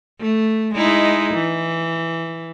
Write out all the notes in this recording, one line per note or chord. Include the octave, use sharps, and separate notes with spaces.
A3
G#3 D#4 E4
E3